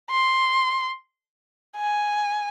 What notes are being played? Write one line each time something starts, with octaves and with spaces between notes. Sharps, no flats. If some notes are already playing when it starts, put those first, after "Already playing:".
C6
G#5